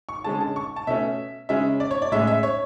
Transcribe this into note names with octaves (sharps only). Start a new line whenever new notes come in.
C#6
D3 G#3 C#4 A5
A5
C#6
A5
B2 A3 C#4 E5
C#3 G#3 C#4 E5
D5
C#5
D5
A2 G#3 C#4 E5
E5
C#5